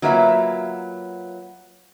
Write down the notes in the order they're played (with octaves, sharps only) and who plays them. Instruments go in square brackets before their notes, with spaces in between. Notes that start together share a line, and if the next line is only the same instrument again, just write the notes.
[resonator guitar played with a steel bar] F#3 A#3 F4 B4 E5